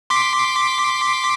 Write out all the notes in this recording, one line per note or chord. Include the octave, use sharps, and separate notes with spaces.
C6 D6 B6